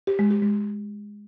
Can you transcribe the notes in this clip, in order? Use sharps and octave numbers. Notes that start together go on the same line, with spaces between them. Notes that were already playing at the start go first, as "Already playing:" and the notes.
G4
G#3
G4
G#3